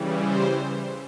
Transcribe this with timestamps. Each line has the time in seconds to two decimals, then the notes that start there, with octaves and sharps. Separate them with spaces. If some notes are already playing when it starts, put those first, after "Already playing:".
Already playing: C#3 E3 G3
0.20 C5